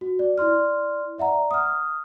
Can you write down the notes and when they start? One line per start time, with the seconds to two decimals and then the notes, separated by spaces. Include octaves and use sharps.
0.01 F#4
0.19 D5
0.38 E4 D5 C6 F6
1.18 D5 E5 F#5 A#5
1.51 D#6 F6